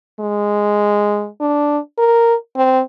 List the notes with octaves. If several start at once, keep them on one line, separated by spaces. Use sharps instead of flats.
G#3
D4
A#4
C4